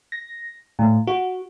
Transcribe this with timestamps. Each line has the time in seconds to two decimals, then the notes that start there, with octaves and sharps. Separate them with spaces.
0.12 A#6
0.79 A2
1.07 F#4